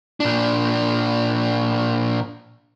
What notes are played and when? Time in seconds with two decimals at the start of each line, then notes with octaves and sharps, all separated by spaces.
0.20 A#2 D4